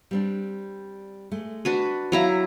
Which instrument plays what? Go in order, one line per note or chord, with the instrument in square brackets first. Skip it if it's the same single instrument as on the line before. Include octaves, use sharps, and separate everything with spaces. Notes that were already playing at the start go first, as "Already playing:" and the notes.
[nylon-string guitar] G3 C4 D4
G#3 A3
[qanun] D4 F#4 B4
[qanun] F#3 E4 A#5 [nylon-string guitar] F#4 F5